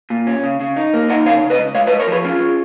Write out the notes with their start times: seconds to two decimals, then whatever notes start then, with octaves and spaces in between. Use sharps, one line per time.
0.10 A#2
0.27 C#4
0.44 C#3
0.60 C#3
0.76 D#4
0.94 A#3
1.09 D#4 D#5 F#5
1.25 C#3 C#5 F5
1.42 C#3
1.50 B4 D#5
1.59 G#3
1.75 G#3 C#5 F5
1.87 B4 D#5
1.92 G#3
2.00 A#4 C#5
2.08 F3 G#4 B4
2.25 C#4 F4 G#4
2.41 C#4